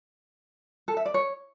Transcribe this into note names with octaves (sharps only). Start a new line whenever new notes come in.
A4
E5
D5
C#5